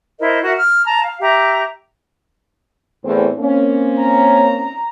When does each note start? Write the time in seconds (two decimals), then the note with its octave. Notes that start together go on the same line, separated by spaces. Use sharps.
0.20 E4 A#4 C5 D#5
0.43 F#4 A#4 E5 F#5
0.57 F6
0.86 A5 A#5
1.04 F5
1.21 G4 E5 A#5
3.04 E2 A2 C4
3.39 A#3 C4 C#4
3.99 A#5